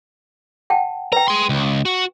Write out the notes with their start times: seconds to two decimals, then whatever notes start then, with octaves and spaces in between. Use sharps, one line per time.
0.70 F#5 G5 A5
1.12 B4 G5 A#5
1.28 G#4 C6
1.49 C#2
1.85 F#4